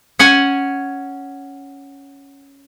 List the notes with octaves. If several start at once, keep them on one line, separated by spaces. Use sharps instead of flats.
C#4 F#5 G#5